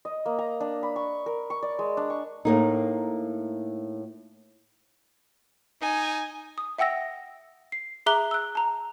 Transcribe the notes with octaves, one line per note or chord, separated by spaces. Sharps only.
D#5
A#3
A#5
D4
B5
C#6
A#4
C#6
D5
G#3
D4
C#6
A2 A#3 D#4
D#4 G#5
D#6
E5 F#5 G5 E6 A#6
C7
G#4 E5 A#5 D6 F#6 G7
E6 F#6
A5 A#5